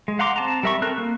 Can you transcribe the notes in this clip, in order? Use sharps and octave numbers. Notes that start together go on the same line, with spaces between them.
G#3
F5 F#5 A#5 C6 D6
C4 A5 A#5
G3 A#4 E5 B5 C#6
C4 A4 A#4 F#6
A#3